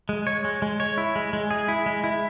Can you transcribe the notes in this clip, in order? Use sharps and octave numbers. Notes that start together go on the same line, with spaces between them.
G#3
C#5
G#3
G#3
C#5
E4
G#3
G#3
G#4
E4
G#3
E4